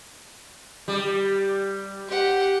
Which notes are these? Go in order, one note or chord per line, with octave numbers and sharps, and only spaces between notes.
G3
G4 F#5